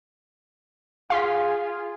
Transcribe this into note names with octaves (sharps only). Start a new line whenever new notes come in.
F4 G#4 F5 C6 B6